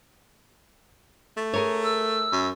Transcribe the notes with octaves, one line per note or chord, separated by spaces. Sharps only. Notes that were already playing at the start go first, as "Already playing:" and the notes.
A3
G#4 A#4 C#5
E6
F#2